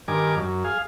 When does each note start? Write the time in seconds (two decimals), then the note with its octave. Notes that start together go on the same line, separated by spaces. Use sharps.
0.08 G2 D#3 A#4 G#5 D6
0.37 F#2
0.64 G#4 F5